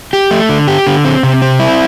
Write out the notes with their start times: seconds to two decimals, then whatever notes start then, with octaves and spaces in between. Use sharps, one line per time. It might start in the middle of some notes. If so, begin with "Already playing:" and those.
0.13 G4
0.31 A3
0.49 D3
0.68 G4
0.87 D3
1.05 C4
1.23 C3
1.42 C4
1.59 E4